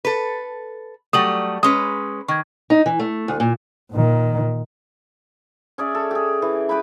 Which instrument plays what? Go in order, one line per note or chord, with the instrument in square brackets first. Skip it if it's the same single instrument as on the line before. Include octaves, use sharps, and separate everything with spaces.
[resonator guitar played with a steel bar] A4 B4
[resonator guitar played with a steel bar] F#3 G3 A3 [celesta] D#6 F#7
[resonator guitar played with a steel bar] G#3 C#4 B4 [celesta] D#6
[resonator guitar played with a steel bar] D#3 [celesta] C#6 G#6
[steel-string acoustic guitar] D#4
E3
A3
D2
A#2
[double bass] A#2 D#3
[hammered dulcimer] C#4 G#4 D5 E5
A4
G4 G#4
E3
G4 B4 G5 B5